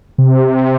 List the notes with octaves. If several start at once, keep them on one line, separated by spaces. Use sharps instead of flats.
C3